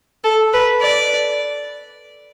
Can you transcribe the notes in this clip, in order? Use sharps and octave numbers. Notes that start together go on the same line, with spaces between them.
A4
B4
D5